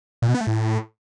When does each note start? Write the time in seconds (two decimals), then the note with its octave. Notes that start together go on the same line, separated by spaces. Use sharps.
0.22 A#2
0.28 B2
0.35 B3
0.41 A3
0.47 A2